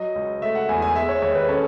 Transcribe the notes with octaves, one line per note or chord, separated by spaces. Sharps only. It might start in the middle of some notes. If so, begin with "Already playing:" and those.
Already playing: F#3 D#5
C#2
A3 E5
F#5
E2 G#5
G#5
G#3 E5
C#5
D#2 C#5
B4
C#4 A4